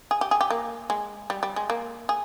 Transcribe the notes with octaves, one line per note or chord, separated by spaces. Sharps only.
G#4
G4
G#4
G4
A#3
G#3
G3
G3
G#3
A#3
G#4